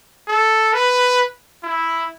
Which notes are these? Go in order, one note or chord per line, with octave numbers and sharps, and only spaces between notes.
A4
B4
E4